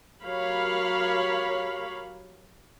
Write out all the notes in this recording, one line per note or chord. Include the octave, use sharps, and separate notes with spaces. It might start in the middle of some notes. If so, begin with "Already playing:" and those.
F#3 G4 A#4 C#5 F5 B5